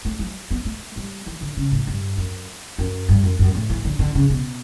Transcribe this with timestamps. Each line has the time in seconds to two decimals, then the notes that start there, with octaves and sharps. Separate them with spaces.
0.05 A3
0.19 F#3
0.51 B3
0.65 A3
0.96 G3
1.26 E3
1.41 D3
1.57 C#3
1.72 A2
1.87 G2
2.17 F#2
2.78 F#2
3.09 G2
3.24 F#2
3.39 F#2
3.55 A2
3.70 E3
3.85 D3
3.99 D3
4.15 C#3
4.30 B2